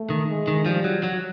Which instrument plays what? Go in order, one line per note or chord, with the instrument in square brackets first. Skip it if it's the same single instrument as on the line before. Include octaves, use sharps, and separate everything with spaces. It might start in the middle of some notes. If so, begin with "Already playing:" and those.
Already playing: [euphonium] A3
[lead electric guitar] D#3
[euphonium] G#3
[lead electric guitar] D#3
[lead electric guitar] F3 [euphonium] G3
[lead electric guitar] F#3
F#3